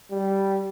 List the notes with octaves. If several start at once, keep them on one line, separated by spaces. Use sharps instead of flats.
G3